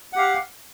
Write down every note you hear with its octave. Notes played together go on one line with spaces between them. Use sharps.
G4 F5 F#5